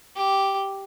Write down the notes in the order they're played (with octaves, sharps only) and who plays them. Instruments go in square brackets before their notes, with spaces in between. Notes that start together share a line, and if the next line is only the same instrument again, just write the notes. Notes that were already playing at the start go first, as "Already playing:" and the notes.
[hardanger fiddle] G4